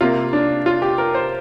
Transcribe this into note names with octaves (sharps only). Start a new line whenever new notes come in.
C3 A#3 F4
D4
F4
G4
A#4
C5